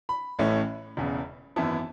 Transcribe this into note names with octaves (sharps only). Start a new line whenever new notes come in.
B5
A1 A2 E3 A3 C#4
E1 E2 C#3
G#1 F#2 E3 B3 E4 A5